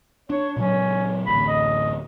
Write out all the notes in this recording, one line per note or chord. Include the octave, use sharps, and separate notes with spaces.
D4 C#5
A#2 C#3 F#3 C#4
A1 D2 B5
D#5